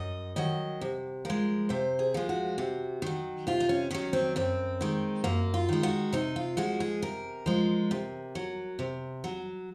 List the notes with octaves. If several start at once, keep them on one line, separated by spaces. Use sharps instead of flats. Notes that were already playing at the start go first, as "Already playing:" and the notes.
Already playing: F#2 D#5
D#3 F#3 D#5
C3
F3 G#3 A#4
C3 C5
G#4
F3 G#3
F#4
C3
D#3 F#3
C3 F4
D#4
C#4
D#3 F#3 C#4
C4
F#2 C4
D#3 G#3
F#2 A#3
F4
D#3 G#3
F#4
C3 D#4
F4
F3 G#3 F#4
G#4
C3 A#4
F3 G#3
C3
F#3
C3
F#3